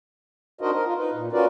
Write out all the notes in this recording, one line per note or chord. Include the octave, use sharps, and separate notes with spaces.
D4 D#4 F#4 A#4 C5 D#5
A#4
F4
D#4 B4
A#2
C#4 F4 F#4 A#4 B4 D5